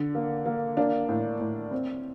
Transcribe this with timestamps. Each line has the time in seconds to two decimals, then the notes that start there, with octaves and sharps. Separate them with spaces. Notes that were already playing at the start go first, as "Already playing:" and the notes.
Already playing: D3
0.15 A#3
0.46 A#3
0.77 A#3 D4
1.09 A2
1.40 A2
1.71 C4